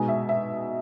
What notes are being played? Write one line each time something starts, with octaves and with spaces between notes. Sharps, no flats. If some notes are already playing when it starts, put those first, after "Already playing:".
Already playing: B2 G#3 D#4 G#5
E5
E5